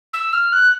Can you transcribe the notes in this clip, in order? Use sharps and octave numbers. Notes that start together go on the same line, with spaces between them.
E6
F6
F#6